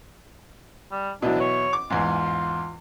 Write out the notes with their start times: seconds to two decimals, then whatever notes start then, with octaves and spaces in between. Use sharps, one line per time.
0.91 G3
1.22 B2 E3 F#3 D4
1.40 C#5
1.73 D6
1.90 E2 G#2 F4